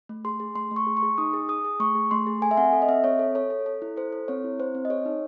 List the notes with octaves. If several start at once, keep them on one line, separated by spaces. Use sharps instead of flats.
A3
G#4 C6
G#4
A3 C6
A3
C#6
G#4
C#6
G#4
D#4 D#6
G#4
G#4 D#6
G#4
A3 C#6
G#4
A3 C6
G#4
A4 G#5
E5
C4 F#5
A4
D#5
C4 E5
C4 C#5
A4
A4 C#5
A4
A4
E4
A4 C5
A4
C4 C#5
E4
C4 C5
C4
D#5
G#4 C#5
D#4